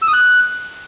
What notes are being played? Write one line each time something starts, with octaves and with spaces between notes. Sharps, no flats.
E6
D#6
F#6